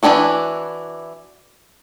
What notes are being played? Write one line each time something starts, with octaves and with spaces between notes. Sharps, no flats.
E3 A3 D4 E4 F#4